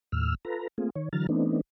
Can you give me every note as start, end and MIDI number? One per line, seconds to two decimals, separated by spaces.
0.12 0.35 39
0.12 0.35 45
0.12 0.35 88
0.12 0.35 89
0.45 0.67 65
0.45 0.67 69
0.45 0.67 71
0.45 0.67 82
0.78 0.90 57
0.78 0.90 58
0.78 0.90 60
0.78 0.90 65
0.78 0.90 68
0.95 1.09 51
0.95 1.09 73
1.13 1.27 50
1.13 1.27 52
1.13 1.27 54
1.13 1.27 82
1.13 1.27 89
1.13 1.27 93
1.29 1.61 52
1.29 1.61 57
1.29 1.61 59
1.29 1.61 60
1.29 1.61 62
1.29 1.61 63